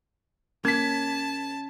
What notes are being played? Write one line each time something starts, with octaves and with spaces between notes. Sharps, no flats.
A#3 C#4 A5 G#6 B6